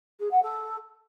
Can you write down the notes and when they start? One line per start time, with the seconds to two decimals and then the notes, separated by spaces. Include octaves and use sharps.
0.19 G#4
0.31 F#5
0.42 A4